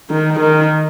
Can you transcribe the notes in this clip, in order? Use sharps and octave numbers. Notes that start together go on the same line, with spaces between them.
D#3
D#3